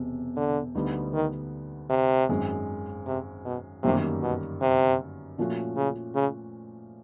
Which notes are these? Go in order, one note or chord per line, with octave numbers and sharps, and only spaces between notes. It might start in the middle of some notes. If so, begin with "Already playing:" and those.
Already playing: E1 C3
D3
D2 D3 G3 B3 D#4
D#3
C3
G#1 F#2 D#3 G#3
C3
B2
G1 F#2 C3 D#3 G3 A#3
B2
C3
A#2 F3 A3 C#4 F#4
C#3
C#3